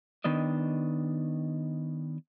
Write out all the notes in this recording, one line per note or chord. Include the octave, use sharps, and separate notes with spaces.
D#3 B3 D4 D#5